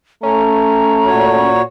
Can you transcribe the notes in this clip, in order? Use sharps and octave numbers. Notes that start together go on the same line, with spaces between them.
A3 C#4 A#5
A#2 F#4 C#5